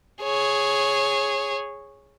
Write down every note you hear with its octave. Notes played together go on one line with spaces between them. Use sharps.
G#4 C#5